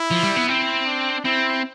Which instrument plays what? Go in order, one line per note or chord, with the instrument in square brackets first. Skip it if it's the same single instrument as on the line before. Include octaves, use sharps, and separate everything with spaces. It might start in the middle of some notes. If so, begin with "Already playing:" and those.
Already playing: [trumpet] E4
[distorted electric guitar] F3
G3
B3
[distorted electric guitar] C4 [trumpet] E4
[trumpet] D4
[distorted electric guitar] C4 [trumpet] E4